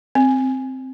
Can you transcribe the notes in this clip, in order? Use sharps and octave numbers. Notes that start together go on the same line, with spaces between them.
C4